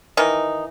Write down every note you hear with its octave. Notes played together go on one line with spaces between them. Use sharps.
D#3 E3 D#4